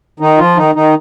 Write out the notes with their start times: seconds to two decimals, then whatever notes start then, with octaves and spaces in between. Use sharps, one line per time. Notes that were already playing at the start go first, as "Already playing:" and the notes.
0.20 D#3 D#4
0.38 F3 F4
0.57 D#3 D#4
0.75 D#3 D#4